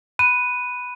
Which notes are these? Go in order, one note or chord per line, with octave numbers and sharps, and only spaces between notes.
B5 F#6 D#7